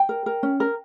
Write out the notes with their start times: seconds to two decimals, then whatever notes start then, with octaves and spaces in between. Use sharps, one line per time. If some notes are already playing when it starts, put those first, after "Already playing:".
Already playing: G5
0.09 A#4
0.26 A#4
0.43 C#4
0.60 A#4